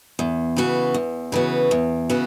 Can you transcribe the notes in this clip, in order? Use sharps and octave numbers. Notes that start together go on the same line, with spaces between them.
E2
C#3 E3 B3 F#4
E2
C#3 E3 B3 F#4
E2
C#3 E3 B3 F#4